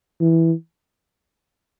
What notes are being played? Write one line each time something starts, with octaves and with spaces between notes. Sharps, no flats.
E3